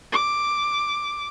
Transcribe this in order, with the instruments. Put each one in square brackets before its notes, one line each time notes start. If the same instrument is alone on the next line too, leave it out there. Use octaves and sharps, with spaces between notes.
[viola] D6